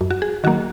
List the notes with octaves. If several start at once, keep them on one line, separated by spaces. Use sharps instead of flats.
F#2
F#4
G#4
D#3 F#3 A#3 F#4